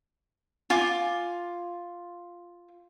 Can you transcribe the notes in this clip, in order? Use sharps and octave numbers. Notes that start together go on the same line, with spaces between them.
F4 G#5 D6